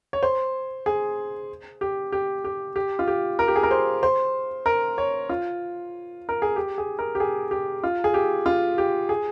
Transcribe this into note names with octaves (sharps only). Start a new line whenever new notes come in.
C#5
C5
G#4
G4
G4
G4
G4
F4
G4
A#4
G4
G#4
A#4
C5
C5
A#4
C#5
F4
A#4
G#4
G4
G#4
A#4
G4
G#4
G4
F4
G#4
G4
F4
G4
G#4